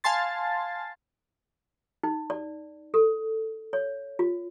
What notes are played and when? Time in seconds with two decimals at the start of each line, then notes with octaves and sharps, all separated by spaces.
0.04 F5 G#5 A5 C6 A6
2.03 D#4
2.30 D5
2.94 A4
3.73 C#5
4.19 F4